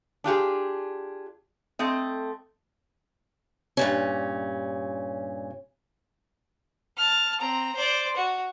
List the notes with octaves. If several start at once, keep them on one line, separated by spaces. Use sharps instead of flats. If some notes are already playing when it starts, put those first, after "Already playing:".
D4 F4 G4 G#4
A3 C4 D#5
G2 A#2 C#4
A5 F6
C4 A#5
C5 D5
F#4